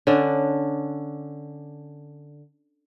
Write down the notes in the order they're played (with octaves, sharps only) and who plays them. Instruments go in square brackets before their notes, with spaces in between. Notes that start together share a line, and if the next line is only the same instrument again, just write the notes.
[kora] D3 C#4 D4